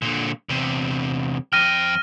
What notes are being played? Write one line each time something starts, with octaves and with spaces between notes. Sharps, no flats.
A#2 D3
E2 C3
F2 G5 F6 A#6 D#7